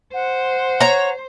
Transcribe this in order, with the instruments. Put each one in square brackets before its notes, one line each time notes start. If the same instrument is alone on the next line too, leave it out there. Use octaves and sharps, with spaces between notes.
[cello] C5 [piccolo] F#5
[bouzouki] C#5 A#5